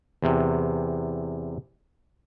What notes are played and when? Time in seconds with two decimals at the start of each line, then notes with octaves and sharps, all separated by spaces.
0.23 E2 C3